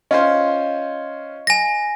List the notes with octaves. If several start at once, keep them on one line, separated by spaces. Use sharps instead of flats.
C#4 F4 C5 D#5 F5
G#5 A#6